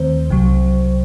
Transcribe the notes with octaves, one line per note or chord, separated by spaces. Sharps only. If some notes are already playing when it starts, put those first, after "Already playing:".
Already playing: D#2 D#3 A3 C4 C5
C2 C3 F#3